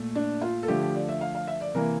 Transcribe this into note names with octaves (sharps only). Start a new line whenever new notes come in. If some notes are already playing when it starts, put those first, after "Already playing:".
Already playing: A#2 A3
D4
F4
A4
D3 F3 A3 G4
G4
D5
E5
F5
F5
E5
D5
C3 E3 A#3 A#4